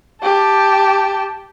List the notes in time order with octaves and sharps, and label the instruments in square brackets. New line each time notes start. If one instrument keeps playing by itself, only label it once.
[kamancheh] G4 A5